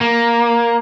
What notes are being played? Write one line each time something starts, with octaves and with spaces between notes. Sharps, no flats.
A#3